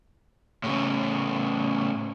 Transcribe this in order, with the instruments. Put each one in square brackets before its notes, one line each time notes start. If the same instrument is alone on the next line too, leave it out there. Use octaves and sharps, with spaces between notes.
[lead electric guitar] A2 C#3